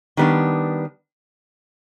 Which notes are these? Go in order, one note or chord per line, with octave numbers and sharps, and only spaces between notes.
D#3 G3 B3 D4